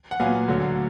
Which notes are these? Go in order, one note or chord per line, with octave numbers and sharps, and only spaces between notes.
F#5
A#2 F#3 B3 F5 G#5
D2 D3 F#3